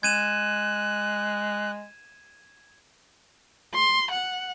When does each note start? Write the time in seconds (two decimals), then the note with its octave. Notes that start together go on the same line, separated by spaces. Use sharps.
0.03 G#3 F#6 G#6 D#7 E7
3.74 C6
4.11 F#5